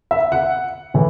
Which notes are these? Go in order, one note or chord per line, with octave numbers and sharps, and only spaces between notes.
E5
F#5
A2 E3